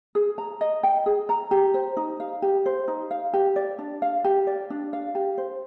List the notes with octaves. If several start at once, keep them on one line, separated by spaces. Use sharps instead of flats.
G#4
A#5
D#5
G5
G#4
A#5
G4
C5
D#4
F5
G4
C5
D#4
F5
G4
D5
D4
F5
G4
D5
D4
F5
G4
C5